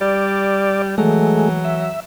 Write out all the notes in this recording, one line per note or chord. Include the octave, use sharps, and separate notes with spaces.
G3 D5
E3 F#3 G#3 A3
E5